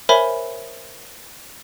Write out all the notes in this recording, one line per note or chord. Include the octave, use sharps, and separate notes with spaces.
A#4 C5 C#5 E5 G#5 B5